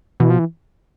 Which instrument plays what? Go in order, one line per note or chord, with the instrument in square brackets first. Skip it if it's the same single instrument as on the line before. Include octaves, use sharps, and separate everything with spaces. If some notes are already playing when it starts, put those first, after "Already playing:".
[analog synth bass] B2 [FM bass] E3
[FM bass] F3
E3